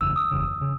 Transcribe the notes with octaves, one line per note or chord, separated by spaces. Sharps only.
F#1 E2 C#3 E6
D#6
F#1 E2 C#3
C#3